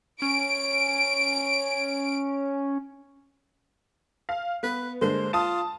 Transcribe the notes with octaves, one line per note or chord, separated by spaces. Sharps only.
C#4 D7
F5
B3 B4
D3 G#3 A#3 C5
F4 A5 D#6